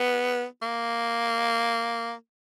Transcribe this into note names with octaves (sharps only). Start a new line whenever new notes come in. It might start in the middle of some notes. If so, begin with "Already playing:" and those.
Already playing: B3
A#3